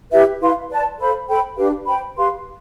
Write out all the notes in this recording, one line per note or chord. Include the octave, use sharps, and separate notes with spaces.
E4 G4 B4 E5
E4 B4 F5 C6
B4 D5 A5
A4 C5 F5 B5
A4 C5 G5 B5
D4 G4 B4 F5
C5 G5 B5
G4 B4 F5 C6